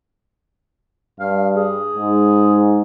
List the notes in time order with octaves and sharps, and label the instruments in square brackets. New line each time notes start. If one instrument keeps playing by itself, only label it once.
[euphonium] G2 [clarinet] F5
[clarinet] G#4
[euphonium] G#2